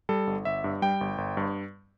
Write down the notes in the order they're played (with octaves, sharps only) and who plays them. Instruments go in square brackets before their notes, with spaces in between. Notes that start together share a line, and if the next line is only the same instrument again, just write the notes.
[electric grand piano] G3 A4
G1
G1 E5
G2
G3 G5
G1
G1
G2